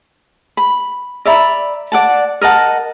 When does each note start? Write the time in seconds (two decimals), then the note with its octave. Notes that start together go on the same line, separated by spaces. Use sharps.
0.57 B5
1.25 D5 E5 A#5 B5
1.92 D5 F#5 A5
2.41 A#4 D#5 F#5 A5